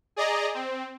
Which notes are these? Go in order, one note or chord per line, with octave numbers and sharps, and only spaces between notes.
G#4 D5 D#5 A#5
C4